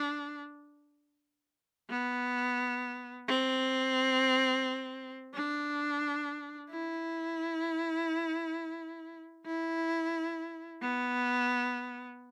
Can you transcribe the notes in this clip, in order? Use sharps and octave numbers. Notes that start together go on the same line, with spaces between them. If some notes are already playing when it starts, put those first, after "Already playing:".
Already playing: D4
B3
C4
D4
E4
E4
B3